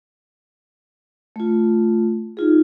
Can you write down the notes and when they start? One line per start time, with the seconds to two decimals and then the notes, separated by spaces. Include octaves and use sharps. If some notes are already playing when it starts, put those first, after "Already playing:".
1.36 A3 F4
2.37 D#4 F4 G#4